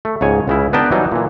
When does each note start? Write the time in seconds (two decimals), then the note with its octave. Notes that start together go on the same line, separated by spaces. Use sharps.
0.05 A3
0.21 C#2 G#2 C#5 G#5
0.48 C#2 C#3 E4
0.73 B3 D4 A#4 B4 G5 A5
0.91 E3 F#3 G3 D#4
1.12 A#2 E3